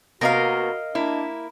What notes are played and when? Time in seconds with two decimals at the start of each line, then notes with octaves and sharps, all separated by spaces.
0.21 C3 A#3 B3 F#4 A#4 D#5 F5
0.95 A#3 D4 E4